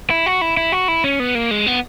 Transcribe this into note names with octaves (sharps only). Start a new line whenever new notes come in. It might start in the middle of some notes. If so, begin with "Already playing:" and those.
E4
F#4
E4
E4
F#4
E4
C#4
B3
A#3
G#3
B3